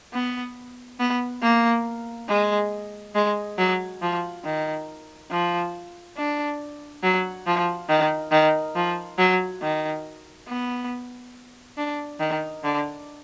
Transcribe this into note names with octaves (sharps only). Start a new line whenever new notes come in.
B3
B3
A#3
G#3
G#3
F#3
F3
D#3
F3
D4
F#3
F3
D#3
D#3
F3
F#3
D#3
B3
D4
D#3
D3